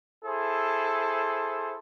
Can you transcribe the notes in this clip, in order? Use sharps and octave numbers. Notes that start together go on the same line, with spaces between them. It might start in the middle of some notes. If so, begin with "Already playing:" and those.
E4 G#4 A4 C5